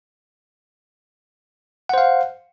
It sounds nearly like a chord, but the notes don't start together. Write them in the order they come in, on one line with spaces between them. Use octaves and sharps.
F#5 C5 F5